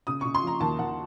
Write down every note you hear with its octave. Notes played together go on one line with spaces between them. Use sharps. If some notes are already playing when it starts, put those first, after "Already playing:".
C#3 D#6
C#3 C#6
C6
F3 A#5
D#2 A5
D#2 F#5